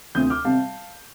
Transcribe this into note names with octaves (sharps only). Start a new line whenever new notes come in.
D2 C3 F3 D#6 G6
D6 F6
C3 G3 F5 A5